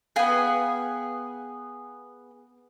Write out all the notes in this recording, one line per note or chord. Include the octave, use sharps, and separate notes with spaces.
B3 G#4 F5 G5 G#5